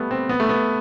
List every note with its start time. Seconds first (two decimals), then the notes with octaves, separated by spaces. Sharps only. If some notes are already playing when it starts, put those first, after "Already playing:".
Already playing: G3 A3 B3
0.11 C4
0.29 B3
0.40 A3
0.49 B3